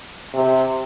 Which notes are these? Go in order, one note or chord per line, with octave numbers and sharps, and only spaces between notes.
C3